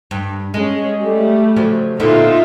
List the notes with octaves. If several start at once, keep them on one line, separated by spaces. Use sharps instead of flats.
G2
G#3 C#4 G#4
G3 A3
C#3 F3 F#3
A#2 D3 B3 D#4 F4 E5